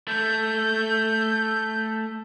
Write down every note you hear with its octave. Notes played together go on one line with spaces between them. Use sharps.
A3 G6